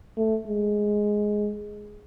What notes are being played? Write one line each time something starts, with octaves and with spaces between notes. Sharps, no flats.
A3
G#3